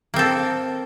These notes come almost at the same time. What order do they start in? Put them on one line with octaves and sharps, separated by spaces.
A#3 C4 A4